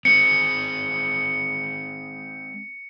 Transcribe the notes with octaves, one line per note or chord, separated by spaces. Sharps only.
G#3 C4 C#7